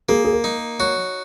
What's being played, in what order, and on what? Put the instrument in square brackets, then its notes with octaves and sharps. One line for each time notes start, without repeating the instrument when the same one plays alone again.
[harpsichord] A#3 [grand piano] G#4
[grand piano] G#4
A#4
[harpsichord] D#4
[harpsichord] F#4 [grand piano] C#5